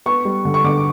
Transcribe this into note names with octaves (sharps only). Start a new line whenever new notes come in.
B3 C#6
G3
D3
C#6
D3 D6